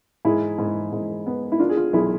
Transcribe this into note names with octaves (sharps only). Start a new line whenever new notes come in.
G#2 E4 G#4
G#2
G#2
B3
E4
D4 F4
G#4
F4
B1 E4 G#4